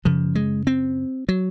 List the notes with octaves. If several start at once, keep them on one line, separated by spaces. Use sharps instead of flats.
F#2 C#3 F3
G#3
C4
F#3